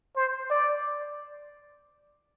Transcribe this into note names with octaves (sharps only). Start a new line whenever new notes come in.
C5
D5